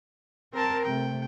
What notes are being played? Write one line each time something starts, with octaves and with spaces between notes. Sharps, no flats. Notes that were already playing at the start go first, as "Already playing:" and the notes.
C4 A#4 A5
C3 A3 G5